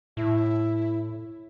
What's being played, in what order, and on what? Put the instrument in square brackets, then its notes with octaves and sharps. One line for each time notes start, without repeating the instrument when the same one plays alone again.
[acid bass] A2 [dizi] E4